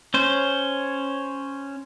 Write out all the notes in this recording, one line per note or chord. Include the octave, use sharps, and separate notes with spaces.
C#4 C5